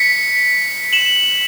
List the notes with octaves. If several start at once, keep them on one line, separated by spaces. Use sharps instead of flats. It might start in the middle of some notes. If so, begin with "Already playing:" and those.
Already playing: B6 C#7
E7 F#7